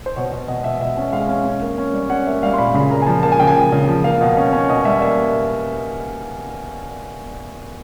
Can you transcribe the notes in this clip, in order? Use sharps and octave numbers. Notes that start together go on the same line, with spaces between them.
C5
B2 C#5
B2
B2 D#5
B2 E5
B2 E5
C#4
G#3 F5
C#4
C#4
A#3
C#4
G3
C#4 F#5
A#3 E5
G3 F5
C6
A#2 B5
C#3 B5
A#3 A#5
G#5
F3 A5
A#3 A5
G#5
C#3 G5
G#5
F3
C#3
F3
A#3 F5
B2
C#4
C#4
B2 D#5
G3 E5
A#3 E5